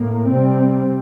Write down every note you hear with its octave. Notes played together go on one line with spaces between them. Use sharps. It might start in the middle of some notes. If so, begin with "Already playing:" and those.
Already playing: A2 A#3
C3 G3 C4